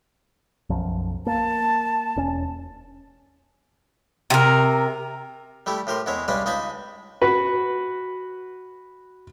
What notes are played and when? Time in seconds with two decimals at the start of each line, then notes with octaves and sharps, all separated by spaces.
0.70 B1 F#2 F3
1.26 A#3 A5
2.16 E1 C#4
4.30 C3 A#4
5.66 G3 A3 E4 G4
5.87 A2 G4 A#4 C6
6.06 E2 G#3 E4 C#5
6.28 G2 G3 G#3 C#4 B4 D5
6.46 C#2 D#4 D#5 G#5 A5 B5
7.22 F#4 B4